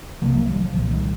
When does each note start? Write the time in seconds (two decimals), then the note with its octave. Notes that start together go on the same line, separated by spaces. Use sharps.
0.21 C2 C3 F3 A#3
0.34 F3 A#3
0.48 D#3 G3
0.60 F3
0.74 C2 A#2 F3
0.91 D#3 G3